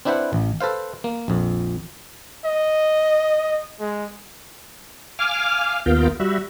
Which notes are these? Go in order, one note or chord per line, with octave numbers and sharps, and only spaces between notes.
C4 D4 E4 B4 C5 F#5
A1
A4 B4 C5 F5
A#3
A#1 F2
D#5
G#3
F5 G#5 D6 F6
D#2 B3 F4 A#4 F5 G6
G3 F#4 E5